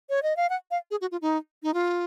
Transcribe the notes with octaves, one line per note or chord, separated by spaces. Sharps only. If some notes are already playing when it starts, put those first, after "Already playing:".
C#5
D#5
F5
F#5
F5
G#4
F#4
F4
D#4
D#4
F4